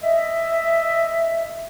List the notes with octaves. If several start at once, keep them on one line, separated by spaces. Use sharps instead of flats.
D#5 E5